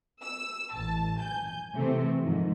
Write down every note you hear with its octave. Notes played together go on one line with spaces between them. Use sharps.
E6
A1 A5
G#5 G6
C3 E3 A3 C4
G#2 D#3 F3